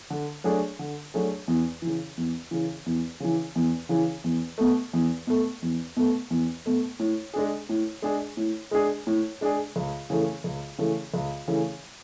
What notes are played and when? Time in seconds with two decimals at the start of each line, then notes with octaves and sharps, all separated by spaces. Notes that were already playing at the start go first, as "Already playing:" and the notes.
0.10 D3
0.44 F#3 A3 D4 G#4
0.79 D3
1.14 F#3 A3 D4 G#4
1.48 E2
1.82 E3
1.87 C#3
2.17 E2
2.51 C#3 E3
2.86 E2
3.20 C#3 E3
3.56 E2
3.89 C#3 E3
4.24 E2
4.58 B2 A3
4.93 E2
5.27 B2 A3
5.62 E2
5.97 B2 A3
6.30 E2
6.66 B2 A3
6.99 A2
7.34 G#3 D4 G#4
7.69 A2
8.02 G#3 D4 G#4
8.37 A2
8.71 G#3 D4 G#4
9.07 A2
9.41 G#3 D4 G#4
9.76 C#2
10.10 C#3 E3 A3
10.44 C#2
10.78 C#3 E3 A3
11.14 C#2
11.48 C#3 E3 A3